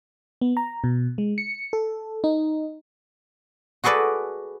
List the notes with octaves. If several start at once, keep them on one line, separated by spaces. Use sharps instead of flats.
B3
A#5
B2
G#3
C#7
A4
D#4
F#4 G#4 A4 B4 D5